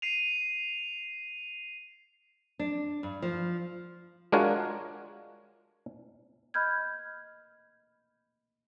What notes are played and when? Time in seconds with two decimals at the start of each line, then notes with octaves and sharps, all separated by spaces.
0.02 C7 D#7 F7
2.59 D4
3.03 G2
3.22 F3
4.32 G#3 D4 F4 F#4 A#4 C#5
6.54 D#5 B5 F6 G6 G#6